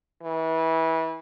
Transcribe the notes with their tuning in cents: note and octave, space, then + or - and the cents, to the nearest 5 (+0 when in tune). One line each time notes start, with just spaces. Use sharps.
E3 -25